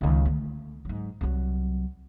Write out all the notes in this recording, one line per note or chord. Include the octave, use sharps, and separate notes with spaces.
C#2 D#3
D3 A3
G#2 F#3
C2 F#3